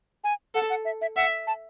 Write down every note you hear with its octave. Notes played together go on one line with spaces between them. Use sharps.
G#5
A4 F#5
F#5
E5
E5
E5 F#5
A5